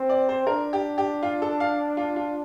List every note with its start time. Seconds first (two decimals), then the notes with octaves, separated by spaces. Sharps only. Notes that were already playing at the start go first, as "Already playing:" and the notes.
Already playing: C4
0.09 D5
0.29 C5
0.47 D4 A#4
0.73 G4
0.98 G4
1.23 F4
1.42 A4
1.60 F5
1.97 F4
2.16 F4